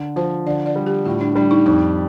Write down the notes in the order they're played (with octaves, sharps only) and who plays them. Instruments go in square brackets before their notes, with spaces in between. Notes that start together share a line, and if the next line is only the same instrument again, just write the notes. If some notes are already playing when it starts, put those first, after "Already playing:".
Already playing: [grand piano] D3
[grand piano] F3 [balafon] C5
[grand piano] D3 [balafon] D5
[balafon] D5
[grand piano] G3
[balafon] G4
[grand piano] A2 [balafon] F4
[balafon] D4
[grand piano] G3 [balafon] D4
[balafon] D#4
[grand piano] F2 [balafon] D#4